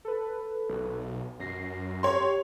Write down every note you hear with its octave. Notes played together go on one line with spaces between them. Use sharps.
A4 B4
B1
F#2 A#6 C7
G4 C#5 C6